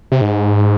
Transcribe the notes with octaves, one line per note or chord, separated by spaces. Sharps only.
C3
G#2